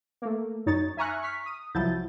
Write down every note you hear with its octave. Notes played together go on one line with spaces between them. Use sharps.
A3 A#3
F#2 D#4 C#5 A6
E5 G#5 A#5 C#6 F6 F#6
C#6 F6 B6
D#6
C2 F3 F#3 E4 G6 A6